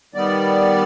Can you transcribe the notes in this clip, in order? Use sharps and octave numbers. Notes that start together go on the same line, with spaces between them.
D#3 G3 B3 D5